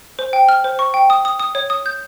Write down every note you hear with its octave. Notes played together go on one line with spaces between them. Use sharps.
C5
G5
F6
C5
C#6
G5
D#6
D#6
D#6
C#5
D#6
G6